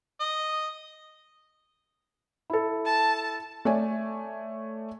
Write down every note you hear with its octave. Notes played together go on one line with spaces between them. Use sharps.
D#5
E4 A4
A5
A3 C#5 D5 G#5